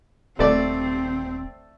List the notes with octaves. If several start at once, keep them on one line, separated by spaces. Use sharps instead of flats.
D#1 A3 C4 D5